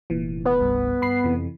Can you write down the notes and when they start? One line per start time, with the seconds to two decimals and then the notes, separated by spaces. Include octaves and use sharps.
0.10 F1 A#2 E3
0.45 B3
0.59 C2 G2
1.02 G2 B5 C7
1.24 F2 C3 E3